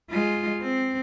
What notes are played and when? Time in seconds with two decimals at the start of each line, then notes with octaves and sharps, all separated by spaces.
0.10 G#3 F4
0.62 C4